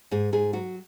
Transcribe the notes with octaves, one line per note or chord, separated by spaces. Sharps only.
G#2 G#4
G#2 G#4
F#3 F#4